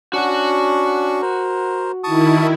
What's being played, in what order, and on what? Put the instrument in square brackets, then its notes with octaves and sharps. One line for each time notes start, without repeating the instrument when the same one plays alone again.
[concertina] C#4 D4 C#6 [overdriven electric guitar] F#4 F#5
[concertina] A#4 C5
[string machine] D#3 E4 [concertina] A5 C#6 D#6